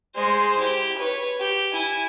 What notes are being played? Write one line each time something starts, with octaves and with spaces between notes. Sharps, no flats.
G#3 C5
E4 G4
B4 C#5
G4
E4 G#5